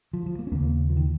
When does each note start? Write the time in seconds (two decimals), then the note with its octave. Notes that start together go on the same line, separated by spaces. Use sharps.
0.13 F3
0.26 F3
0.39 A#3
0.47 C#4
0.51 D#2 C#3 A#3
0.89 F3
0.96 D#3